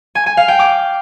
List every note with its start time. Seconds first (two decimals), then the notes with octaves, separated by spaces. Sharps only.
0.15 G#5
0.26 G#5
0.37 F5
0.48 G5
0.59 D6